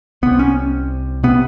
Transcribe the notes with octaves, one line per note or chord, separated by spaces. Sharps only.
C2 C3 B3
C#4
C3 B3